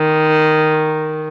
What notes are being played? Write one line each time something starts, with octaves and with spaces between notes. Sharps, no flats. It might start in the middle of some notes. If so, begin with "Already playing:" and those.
Already playing: D#3